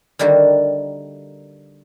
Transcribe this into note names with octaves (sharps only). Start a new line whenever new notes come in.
D3 D#3 G3 A#3 F#4